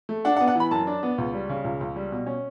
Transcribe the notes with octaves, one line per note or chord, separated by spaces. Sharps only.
A3
D4 F#5
F#5
B3
F#5
E3 B5
F#2 A5
D4
B3
C#2
G3
C#3
C#2
C#2
G3
B2
C#4